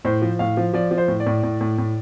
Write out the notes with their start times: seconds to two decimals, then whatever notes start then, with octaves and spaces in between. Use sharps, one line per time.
0.05 A2 C5
0.22 F3
0.39 A2 F5
0.57 F3
0.74 F3 D5
0.91 F3
0.98 C5
1.08 A2
1.20 D5
1.26 A2
1.43 A2
1.61 A2
1.78 A2